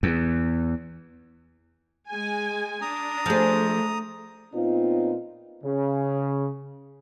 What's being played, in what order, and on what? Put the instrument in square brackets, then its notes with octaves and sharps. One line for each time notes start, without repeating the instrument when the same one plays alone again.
[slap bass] E2
[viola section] G#3 G#5
[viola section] D4 [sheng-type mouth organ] A#5 D#6
[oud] F3 G#4 [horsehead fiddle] A3
[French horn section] A#2 B3 C4 D#4 F4
[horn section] C#3